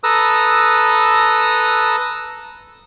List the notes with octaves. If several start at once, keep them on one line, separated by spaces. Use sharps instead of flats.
A4 B4 A#5 D#6 E6